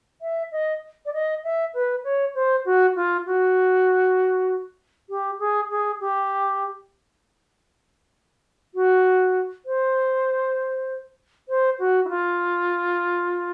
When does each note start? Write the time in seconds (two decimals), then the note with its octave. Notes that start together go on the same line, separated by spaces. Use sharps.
0.21 E5
0.52 D#5
1.05 D5
1.13 D#5
1.44 E5
1.74 B4
2.04 C#5
2.35 C5
2.65 F#4
2.96 F4
3.26 F#4
5.09 G4
5.39 G#4
5.70 G#4
6.00 G4
8.74 F#4
9.66 C5
11.49 C5
11.79 F#4
12.05 E4
12.09 F4